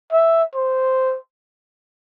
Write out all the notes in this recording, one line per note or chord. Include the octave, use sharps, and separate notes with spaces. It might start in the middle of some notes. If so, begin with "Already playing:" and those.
E5
C5